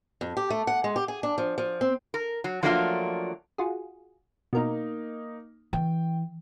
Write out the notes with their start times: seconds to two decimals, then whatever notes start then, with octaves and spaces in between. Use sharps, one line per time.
0.21 F2
0.37 G4
0.50 A3
0.67 F#5
0.84 G#3
0.96 G4
1.08 G#4
1.23 D4
1.38 F3
1.58 F3
1.81 C4
2.14 A#4
2.44 F#3
2.63 F3 F#3 A3 A#3 D4 F4
3.58 F4 F#4 G#4
4.53 B2 A#3 D#4 A#4
5.73 E3 G5